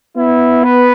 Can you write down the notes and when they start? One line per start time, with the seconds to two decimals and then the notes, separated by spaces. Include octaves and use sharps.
0.17 B3 E4
0.64 B4